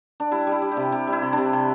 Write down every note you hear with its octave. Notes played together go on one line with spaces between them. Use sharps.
D4
G3 E4
G3 E4
G3
G4
C3
C3 G4
G3
E4
C3
C3 D4
C3